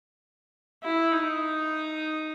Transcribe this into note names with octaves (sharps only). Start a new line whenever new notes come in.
E4
D#4